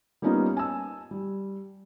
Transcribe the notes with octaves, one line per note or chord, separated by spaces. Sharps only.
G3 A#3 B3 C#4 D#4 F4
G#5 A5 E6
G3